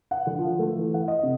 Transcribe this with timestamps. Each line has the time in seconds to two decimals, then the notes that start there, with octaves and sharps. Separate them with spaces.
0.11 F#5
0.27 D3
0.39 F3
0.59 A3
0.75 E3
0.94 F#5
1.08 D#5
1.23 C3